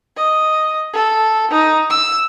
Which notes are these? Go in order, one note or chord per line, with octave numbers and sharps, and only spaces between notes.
D#5
A4
D#4
E6